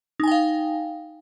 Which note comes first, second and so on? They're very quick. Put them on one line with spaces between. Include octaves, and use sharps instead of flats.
D#4 G#5 G5 F5